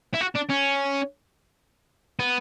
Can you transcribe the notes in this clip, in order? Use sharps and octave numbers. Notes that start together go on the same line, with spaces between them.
E4
F#4
D4
C#4
B3